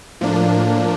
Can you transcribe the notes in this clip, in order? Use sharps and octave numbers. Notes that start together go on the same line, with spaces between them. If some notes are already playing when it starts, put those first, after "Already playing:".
A2 F3 A#3 D4